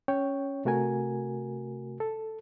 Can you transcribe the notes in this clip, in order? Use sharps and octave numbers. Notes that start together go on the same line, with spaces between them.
C#4 C#5 G5
C3 A3 F#4 A#4 G#5
A4